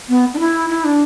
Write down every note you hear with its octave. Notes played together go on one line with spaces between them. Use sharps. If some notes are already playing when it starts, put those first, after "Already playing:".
B3
D4
E4
E4
D4